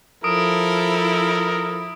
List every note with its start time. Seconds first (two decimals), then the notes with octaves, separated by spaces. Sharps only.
0.24 F3 E4 A4 A#4 D#6 D7